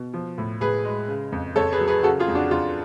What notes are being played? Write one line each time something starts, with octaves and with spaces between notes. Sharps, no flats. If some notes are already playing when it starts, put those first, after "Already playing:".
Already playing: B2
F3
A2
A2 G#4 B4
G#3
C#3
F2
F2 A4 C#5
G#4 B4
F#3
G#4 B4
C#3 F#4 A4
F4 G#4
F2
D4 F#4
F2 F4